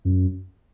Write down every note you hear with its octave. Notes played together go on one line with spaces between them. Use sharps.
F#2